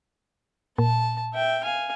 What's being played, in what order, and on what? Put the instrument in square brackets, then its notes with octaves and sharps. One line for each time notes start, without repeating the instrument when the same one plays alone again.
[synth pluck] A#2 [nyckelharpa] A5
[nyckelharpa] E5 G5
F5 G#5